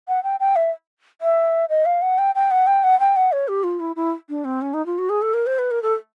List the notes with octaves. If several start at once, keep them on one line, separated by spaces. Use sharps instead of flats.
F#5
G5
G5
E5
E5
D#5
F5
F#5
G5
G5
F#5
G5
F#5
G5
F#5
C#5
G4
F4
E4
E4
D4
C4
C#4
D#4
F4
F#4
G#4
A4
A#4
C5
B4
A#4
A4